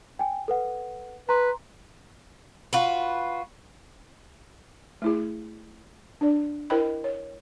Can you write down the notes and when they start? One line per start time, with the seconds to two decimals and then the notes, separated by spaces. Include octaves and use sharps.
0.19 G5 G#5
0.48 A4 B4 F#5
1.29 B4 A#5 C6
2.73 F4 F#4 B4
5.02 A3 E4 G#4
6.21 D4 D5
6.70 E4 A#4 C5 D#5 G5 B5
7.04 C#5